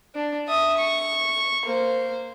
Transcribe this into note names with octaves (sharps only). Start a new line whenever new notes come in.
D4
E5 D#6
C#6
A#3 C5